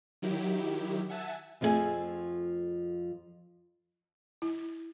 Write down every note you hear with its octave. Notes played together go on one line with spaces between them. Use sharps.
D#3 F#3 E4 G4
E5 F#5 G#5 A5 E6
F2 F3 A3 F4 G#4 G#5
E4